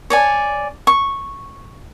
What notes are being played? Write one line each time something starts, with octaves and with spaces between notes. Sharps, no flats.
C#5 D5 G#5
C#6